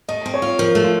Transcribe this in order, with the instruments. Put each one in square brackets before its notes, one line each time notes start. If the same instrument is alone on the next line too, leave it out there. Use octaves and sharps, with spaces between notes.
[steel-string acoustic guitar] A3 [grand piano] D#5
[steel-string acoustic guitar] C4
[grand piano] C#5
[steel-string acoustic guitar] F4
[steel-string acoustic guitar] F3 [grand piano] A#4
[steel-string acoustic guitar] A3
[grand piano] F4